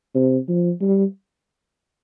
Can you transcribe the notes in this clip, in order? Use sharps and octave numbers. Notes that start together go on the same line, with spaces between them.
C3
F3
G3